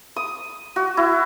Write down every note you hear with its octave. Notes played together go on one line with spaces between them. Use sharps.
D#6
F#4
E4